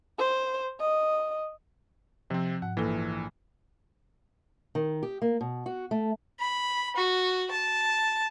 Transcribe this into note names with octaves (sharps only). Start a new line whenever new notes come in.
C5
D#5
C3 F3 C4
G#2 F#5
A#1 E3 A#3 A4
D#3
G4
A#3
B2
F#4
A3
B5
F#4
A5